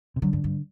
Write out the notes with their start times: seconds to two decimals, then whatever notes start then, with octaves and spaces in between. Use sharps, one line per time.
0.16 C3
0.22 D3 F#3
0.33 G2
0.44 G2